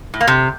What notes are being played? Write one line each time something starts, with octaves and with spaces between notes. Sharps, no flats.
A2
A#3
C3